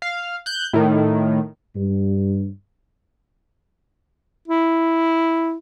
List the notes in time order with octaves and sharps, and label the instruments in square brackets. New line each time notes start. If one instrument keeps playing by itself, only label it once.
[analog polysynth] F5
F#6 G6
A2 D#3
[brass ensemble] G2
[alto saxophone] E4